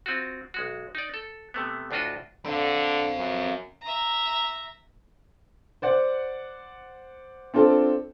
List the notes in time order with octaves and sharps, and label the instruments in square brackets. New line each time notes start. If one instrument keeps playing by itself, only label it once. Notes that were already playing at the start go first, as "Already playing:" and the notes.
[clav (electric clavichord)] C4 F4 F#4
B1 G#3 F#4
D#4 D5
A4
C3 A3 B3
D2 A2 D4 F4 F#4 D#5
[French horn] D3 [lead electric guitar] C4 F5
[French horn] F#2
[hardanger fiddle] E5 A#5
[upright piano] C5 D5 F#5
C4 D4 F4 A4